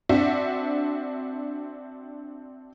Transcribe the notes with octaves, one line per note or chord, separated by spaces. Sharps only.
C4 D4 F#4 E5